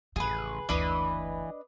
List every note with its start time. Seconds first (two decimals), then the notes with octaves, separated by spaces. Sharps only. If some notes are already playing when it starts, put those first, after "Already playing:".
0.16 A1 F2 C#3 G#4 B4
0.69 F#1 D2 E3 D4 B4 D#5